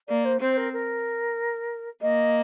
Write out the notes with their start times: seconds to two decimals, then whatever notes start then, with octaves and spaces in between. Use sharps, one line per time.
0.08 A#3 D5
0.25 C5
0.41 C4 C5
0.57 A#4
0.73 A#4
2.02 A#3 D#5